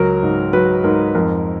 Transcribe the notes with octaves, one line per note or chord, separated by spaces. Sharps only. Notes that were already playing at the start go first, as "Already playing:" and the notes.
Already playing: C#2 F#3 A#4
G#2
F#3 B4
G#2 A#4
F2 A#4